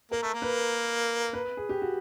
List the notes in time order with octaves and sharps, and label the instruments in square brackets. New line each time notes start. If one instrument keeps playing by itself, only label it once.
[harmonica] A#3 [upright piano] A#4
[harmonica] A3
A#3
[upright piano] B4
B4
G#4
G4
F#4